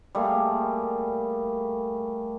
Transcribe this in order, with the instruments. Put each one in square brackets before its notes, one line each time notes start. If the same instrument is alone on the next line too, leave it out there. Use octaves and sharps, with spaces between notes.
[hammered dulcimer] G3 A3 A#3 G#4